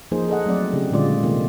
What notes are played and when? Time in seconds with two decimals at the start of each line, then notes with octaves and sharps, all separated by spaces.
0.12 F3 A#3 D#4 G#4 C5
0.29 G#4 A4 D#5 F#5
0.46 F#3 A3 C4 D5
0.73 C#3 G4
0.92 A#2 D3 G#3 F4 D5 D#5
1.23 C3 D#3 A3 A#3 C4